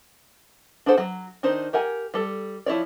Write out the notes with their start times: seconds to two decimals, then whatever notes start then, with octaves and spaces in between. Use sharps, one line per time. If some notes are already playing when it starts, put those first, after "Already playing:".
0.86 D4 G#4 A4 C5 F#5
0.98 F#3
1.43 D#3 D4 D#4 C5
1.73 G4 A#4 F#5 G#5
2.14 G3 A4
2.66 F3 E4 C#5 D5